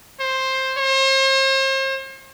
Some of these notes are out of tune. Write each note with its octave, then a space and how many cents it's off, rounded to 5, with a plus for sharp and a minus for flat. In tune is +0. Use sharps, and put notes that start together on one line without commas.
C5 +10
C5 +40